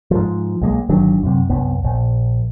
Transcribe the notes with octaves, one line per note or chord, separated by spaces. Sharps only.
G#2 F3
B1 G#3 A#3
G1 D#3 F#3 D4
F#2 C3
C2 F#2 B3
A#1